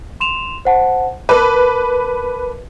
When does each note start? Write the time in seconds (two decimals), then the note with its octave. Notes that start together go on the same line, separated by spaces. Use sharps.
0.20 C6 E7 F7
0.65 C5 F#5 A5
1.29 A#4 B4 A5 D6